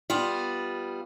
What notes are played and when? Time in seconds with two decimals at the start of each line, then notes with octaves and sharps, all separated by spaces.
0.10 G3 B3 F4